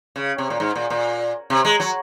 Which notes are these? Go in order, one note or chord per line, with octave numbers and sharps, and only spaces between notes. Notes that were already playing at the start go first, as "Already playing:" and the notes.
C#3
C3
A#2
G#2
A#2
A#2
C3
G#3
F#3